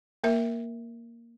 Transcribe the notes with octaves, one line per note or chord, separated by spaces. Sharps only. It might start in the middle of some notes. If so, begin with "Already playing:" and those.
A#3 A#4 E5